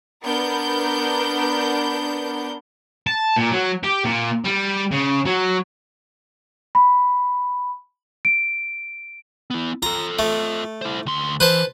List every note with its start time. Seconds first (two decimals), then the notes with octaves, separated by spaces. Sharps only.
0.24 B3 D4 A#4 G6
3.07 A5
3.36 A#2
3.51 F#3
3.83 G4
4.05 A#2
4.45 G3
4.91 C#3
5.26 F#3
6.75 B5
8.25 D7
9.50 B3 E4
9.83 F4 A4 A#5
10.19 A3
10.82 E4 C5
11.06 D2 C6
11.40 E3 B4 C5 A5